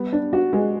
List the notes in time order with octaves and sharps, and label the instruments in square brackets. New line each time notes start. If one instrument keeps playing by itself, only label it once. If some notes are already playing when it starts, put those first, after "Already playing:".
Already playing: [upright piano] G3 B3
D4
F#4
G#3